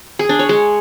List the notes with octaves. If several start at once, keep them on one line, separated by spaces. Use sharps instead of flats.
G#4
D4
C#5
G#3